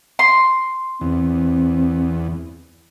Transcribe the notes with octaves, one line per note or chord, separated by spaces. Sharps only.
C6
E2 C4